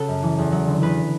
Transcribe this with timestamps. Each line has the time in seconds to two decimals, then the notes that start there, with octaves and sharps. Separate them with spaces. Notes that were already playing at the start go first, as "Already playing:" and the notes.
Already playing: C#3 F#4 A4
0.08 F#2
0.23 E3
0.38 E2
0.52 F#3
0.67 D3
0.82 E2 B4